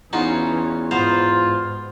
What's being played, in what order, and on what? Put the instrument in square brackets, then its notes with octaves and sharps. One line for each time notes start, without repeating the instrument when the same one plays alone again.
[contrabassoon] E2 [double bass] E3 C#4 [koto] D#4 F4 F#4
[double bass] G#2 [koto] B3 C5 A#5 [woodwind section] F4